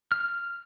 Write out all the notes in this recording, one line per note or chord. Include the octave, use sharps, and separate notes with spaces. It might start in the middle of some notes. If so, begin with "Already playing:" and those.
F6